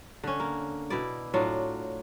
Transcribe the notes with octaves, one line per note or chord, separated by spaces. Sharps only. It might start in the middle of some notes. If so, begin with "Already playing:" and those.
D3 C#4
A#3
B2 E4 D5
A2 F#3 D4 F4